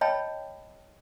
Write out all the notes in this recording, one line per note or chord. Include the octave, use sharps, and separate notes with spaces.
C#5 D#5 G5 A5 B5